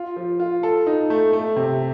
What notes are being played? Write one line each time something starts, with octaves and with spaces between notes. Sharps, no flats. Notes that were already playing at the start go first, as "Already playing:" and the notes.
Already playing: F4
F3
F4
A4
D#4
A3
A3
C3